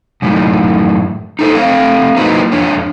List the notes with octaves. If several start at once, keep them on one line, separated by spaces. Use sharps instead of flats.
F#2 A2 D#3
D#4 A4 C5
A3 C4 F5
F#3 A#3 D#4 E4 B4 C5
F2 D4 C#5